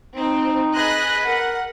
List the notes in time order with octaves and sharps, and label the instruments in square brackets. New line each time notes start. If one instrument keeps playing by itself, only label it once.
[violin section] C4 [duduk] D#4
[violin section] G#4 D#5 F#6 [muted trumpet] B4
[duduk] A#4 [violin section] F#5